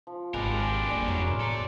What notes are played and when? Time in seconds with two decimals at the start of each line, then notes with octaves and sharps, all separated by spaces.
0.07 F3
0.34 G#1 G#3 D4 G4 A#4 B4
0.90 F2 G3 A#3
1.08 F2 F#3 E4
1.27 A2 B3 A#5 C6
1.40 A4 D5